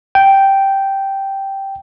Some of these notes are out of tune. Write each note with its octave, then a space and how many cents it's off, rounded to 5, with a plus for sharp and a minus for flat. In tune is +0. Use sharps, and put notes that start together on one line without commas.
G5 -5